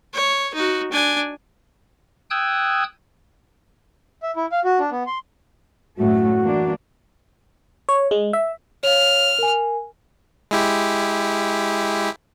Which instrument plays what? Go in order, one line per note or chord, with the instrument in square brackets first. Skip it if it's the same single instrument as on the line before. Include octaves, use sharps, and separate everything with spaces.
[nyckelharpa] C#5
D#4 F#4
D4 G#5
[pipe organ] G5 D#6 E6 F#6 G#6
[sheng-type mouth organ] E5
E4
F5
F#4
D4
B3
C6
[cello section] F#2 A2 A3 [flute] F#4
[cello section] E3 A#3 D4
[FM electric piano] C#5
G#3
E5
[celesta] C#5 F5 [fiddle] F6
[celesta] A#4 G#5
[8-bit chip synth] G#3 E4 G4